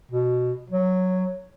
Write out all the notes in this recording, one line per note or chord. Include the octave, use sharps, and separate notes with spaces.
B2
F#3